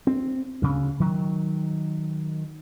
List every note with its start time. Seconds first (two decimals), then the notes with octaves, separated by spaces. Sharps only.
0.07 C4
0.62 D2 C#3
1.00 D#3 F#3